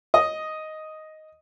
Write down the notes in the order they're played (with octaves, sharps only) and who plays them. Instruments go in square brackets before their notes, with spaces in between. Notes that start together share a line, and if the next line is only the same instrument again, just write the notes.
[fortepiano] D#5